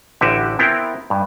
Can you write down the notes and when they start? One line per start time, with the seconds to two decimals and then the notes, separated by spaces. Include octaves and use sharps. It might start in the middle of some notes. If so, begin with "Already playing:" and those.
0.21 A1 D3 F#4 G4 B4 E5
0.59 B3 C4 E4 A#4 G5
1.10 G2